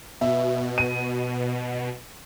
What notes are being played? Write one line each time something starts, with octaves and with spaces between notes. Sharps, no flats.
B2 E5
D#7